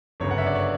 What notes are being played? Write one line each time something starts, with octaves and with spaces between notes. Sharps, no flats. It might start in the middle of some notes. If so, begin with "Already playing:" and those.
G1 F#2 C#3 C#5
F#5
E5
D5
C#5